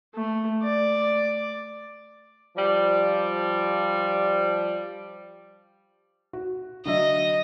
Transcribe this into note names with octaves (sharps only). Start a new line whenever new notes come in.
A3
D5
F3 G3
F#4
D3 F#3 D#5 E5